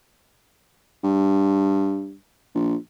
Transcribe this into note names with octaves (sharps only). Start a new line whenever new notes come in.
G2
A#1